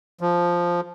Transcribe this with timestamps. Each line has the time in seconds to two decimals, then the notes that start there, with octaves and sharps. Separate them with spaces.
0.21 F3